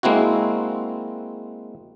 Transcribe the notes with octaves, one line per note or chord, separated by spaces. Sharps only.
G#3 A#3 C4 E4 F#4